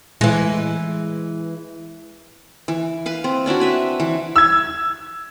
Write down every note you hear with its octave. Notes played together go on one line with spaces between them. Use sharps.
E3 G#3
E3
B4 F5
C4
C#4 D4 E4 F#4
C4 B4 E5
E3
E6 G#6